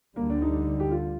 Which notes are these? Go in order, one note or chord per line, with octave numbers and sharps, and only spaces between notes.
D2 D3 G3 A#3
D4
D#4
G4
F4